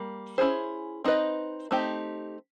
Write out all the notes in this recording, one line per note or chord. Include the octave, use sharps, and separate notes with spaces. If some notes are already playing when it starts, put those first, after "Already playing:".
Already playing: G3 A#3
C#4 E4 G#4 C5
C4 D#4 F#4 B4 D#5
A3 C4 D#4 G4